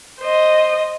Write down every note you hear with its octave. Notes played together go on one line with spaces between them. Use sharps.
C5 D#5